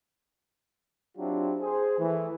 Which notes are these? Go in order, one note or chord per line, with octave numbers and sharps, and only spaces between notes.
F#3 C4 D4 E4 F4 G4
G#4 C5
E3 A3